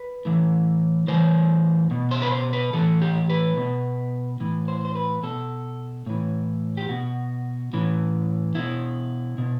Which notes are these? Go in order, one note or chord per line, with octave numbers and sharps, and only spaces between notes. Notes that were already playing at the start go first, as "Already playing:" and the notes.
Already playing: B4
A2 E3
A2 E3 C5
B2
C5
B4
C5
B4
A2 E3 A4
G4
B4
B2
A2 E3
C5
C5
B4
B2 A4
A2 E3
G4
B2 F#4
A2 E3
B2 E4
B2